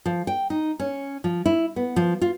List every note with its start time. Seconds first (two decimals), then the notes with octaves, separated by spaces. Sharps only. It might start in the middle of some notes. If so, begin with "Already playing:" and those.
0.06 F3
0.27 G5
0.50 D#4
0.79 C#4
1.24 F3
1.46 E4
1.76 B3
1.96 F3
2.22 F4